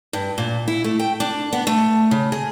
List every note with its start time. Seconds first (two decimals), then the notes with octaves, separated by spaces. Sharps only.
0.13 G2
0.38 A#2
0.68 E4
0.84 A3
1.00 G5
1.20 D4
1.53 B3
1.67 A3
2.11 C#3
2.32 G#4